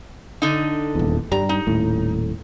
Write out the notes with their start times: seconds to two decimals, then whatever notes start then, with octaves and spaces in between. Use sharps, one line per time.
0.42 D3 D#4
0.95 D#1 E2
1.32 G2 G3 A#5
1.49 D#4
1.67 D#1 A2